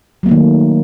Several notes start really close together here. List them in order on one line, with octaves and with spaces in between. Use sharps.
F#3 A#3 A3 D#3